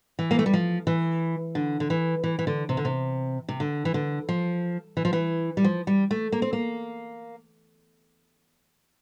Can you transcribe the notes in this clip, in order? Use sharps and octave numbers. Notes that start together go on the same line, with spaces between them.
E3
A#3
A3
G3
F3
E3
D3
D3
E3
E3
E3
D3
C3
D3
C3
C3
D3
E3
D3
F3
E3
F3
E3
G3
F3
G3
A3
A#3
C4
A#3